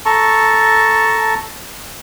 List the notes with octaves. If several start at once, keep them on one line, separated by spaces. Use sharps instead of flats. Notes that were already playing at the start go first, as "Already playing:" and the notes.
A4 A5 A#5 C#6